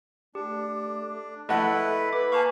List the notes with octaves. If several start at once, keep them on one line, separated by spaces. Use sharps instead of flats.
A3 D4 G4
A3 E4 A4 B4 D#5 F#5
B4 D6
A#3 F5 G#5 A5 C#6